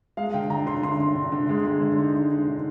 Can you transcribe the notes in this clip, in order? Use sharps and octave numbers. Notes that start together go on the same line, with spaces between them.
G#3 F5
D3 G5
D3 A#5
D3 C6
D3 C6
D3
D3
D3
G#3
G#3
D3
D#4
D#4
D#4
D3